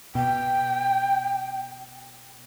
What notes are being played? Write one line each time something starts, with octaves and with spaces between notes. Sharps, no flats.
B2 G5